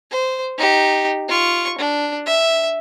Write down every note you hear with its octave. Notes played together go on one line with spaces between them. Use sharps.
C5
D#4 G4
F4 C#6
D4
E5